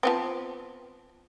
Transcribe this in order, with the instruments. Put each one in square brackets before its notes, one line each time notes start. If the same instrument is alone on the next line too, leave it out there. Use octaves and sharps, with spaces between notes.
[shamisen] F3 B3 C4